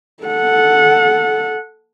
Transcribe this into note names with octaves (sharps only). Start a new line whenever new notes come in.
A4 F#5